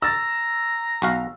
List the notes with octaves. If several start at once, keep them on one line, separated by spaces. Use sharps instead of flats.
A#5 E6 A6
B1 F#4 F5